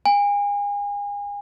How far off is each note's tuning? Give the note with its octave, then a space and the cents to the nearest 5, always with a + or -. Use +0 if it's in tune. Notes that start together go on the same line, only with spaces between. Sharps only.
G#5 -35